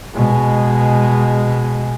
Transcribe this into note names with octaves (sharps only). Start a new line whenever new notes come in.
B2 G#3